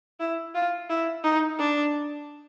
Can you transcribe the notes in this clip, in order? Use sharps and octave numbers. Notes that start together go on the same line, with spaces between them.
E4
F4
E4
D#4
D4